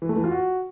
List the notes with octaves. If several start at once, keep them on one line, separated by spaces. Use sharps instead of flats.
E3
A3
E3
F4
F#4